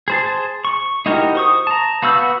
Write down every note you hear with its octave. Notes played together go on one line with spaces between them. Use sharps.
G#4 C5 A5
C#6
D#4 E4 F#4 G4 A#4
C5 C#6 D#6
A5 A#5
B3 F#4 F5 E6 G6